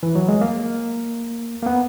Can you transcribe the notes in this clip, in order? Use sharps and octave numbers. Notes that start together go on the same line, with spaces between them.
E3
F#3
G#3
A#3
A#3
B3